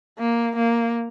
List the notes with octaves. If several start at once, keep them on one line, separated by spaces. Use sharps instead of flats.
A#3
A#3